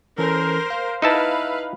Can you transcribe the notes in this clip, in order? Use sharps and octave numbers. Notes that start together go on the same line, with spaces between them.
E3 C#4 A4 A#4 C5
F5
D#4 E4 B4 E5 F5 A5 E6